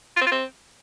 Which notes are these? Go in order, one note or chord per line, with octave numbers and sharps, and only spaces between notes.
F4
C4
F4
C4